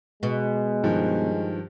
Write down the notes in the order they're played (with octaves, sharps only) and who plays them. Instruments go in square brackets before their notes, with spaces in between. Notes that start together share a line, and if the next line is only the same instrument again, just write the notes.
[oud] B2 [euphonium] G#3
[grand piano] G2 D#3 F3